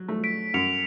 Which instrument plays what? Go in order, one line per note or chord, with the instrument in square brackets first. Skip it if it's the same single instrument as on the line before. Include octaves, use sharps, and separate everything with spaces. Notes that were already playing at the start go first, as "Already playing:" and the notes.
Already playing: [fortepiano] F#3
A3
[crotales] B6 D7
[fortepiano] F#2 [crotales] C#7 F7